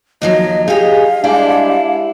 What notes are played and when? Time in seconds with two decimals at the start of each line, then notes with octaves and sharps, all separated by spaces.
0.22 D#2 F3 F#3 D#5
0.68 D#4 G4 G#4 F5
1.24 G3 G#3 D4 E4 G4 G#4